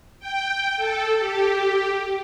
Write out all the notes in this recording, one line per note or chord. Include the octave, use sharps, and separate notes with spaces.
G5
A4
G4